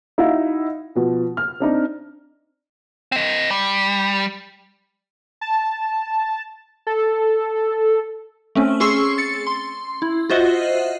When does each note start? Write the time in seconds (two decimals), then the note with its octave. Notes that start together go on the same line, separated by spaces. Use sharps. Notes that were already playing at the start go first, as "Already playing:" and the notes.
0.18 D#4 E4 F#4 E5 F5
0.95 B2 F3
1.37 F6
1.60 C4 D4 D#4
3.12 C4 D#5
3.51 G3
5.41 A5
6.87 A4
8.55 A3 C4 C#4
8.80 C#4 G#4 C6 C#6 E6 C7
9.18 A6 C#7
9.47 C6
10.02 E4
10.30 F4 F#4 C5 D#5 E5 F#5